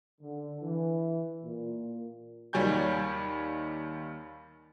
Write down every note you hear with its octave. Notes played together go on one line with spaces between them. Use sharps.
D3
E3
A#2
D#2 D#3 G3 C#5 G#5 G6